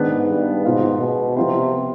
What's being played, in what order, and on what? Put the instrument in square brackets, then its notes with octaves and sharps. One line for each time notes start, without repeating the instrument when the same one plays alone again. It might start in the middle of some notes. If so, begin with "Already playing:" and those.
Already playing: [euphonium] G#2 [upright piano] D#3 B3 D4 G#4
[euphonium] G2
[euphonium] G#2 [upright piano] B2 B3 F4 C5 F5
[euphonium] B2
[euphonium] C3 [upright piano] F3 B3 F4 C5